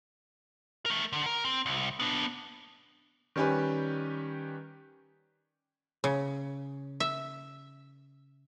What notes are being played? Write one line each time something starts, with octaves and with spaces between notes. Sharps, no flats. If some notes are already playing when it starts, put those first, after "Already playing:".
A3 A#4
D3
A#4
C4
C2
B3 D4
D#3 G3 C#4 G4 B4
C#3
E5